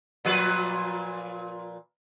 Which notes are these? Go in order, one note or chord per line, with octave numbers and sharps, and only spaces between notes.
A#2 F3 B4